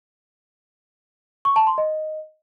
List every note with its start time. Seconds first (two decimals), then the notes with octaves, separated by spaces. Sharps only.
1.45 C#6
1.56 A5
1.67 C6
1.78 D#5